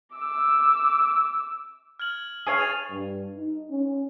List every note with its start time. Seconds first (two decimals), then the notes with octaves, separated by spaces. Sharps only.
0.15 D6 E6
2.00 F6 G#6 F#7
2.47 G#4 C#5 F5
2.58 A6 D#7 F7
2.90 G2
3.37 D#4
3.71 C#4